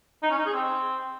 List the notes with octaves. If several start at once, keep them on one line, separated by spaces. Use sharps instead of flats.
D#4
C#4
D#4
G#4
C4